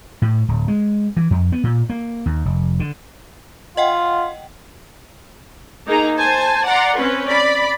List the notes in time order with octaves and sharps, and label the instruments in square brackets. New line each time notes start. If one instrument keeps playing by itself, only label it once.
[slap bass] A2
D1
G#3
E3
F2
B3
A#2
A#3
D#2
F1
D3
[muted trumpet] F4 [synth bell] D#5 F#5 G5
[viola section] A#3 D#4 G#4 A#5
C5 G#5 A5
D5 F#5 A#5 C6
C4 C#4 B4
D5 B5